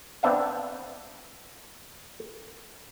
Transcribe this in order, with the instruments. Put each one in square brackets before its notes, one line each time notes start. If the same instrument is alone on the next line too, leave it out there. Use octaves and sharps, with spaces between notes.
[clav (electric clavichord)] B3 C4 D4 E5 F5